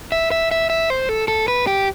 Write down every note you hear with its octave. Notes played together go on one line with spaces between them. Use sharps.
E5
E5
E5
E5
C5
A4
A4
B4
G4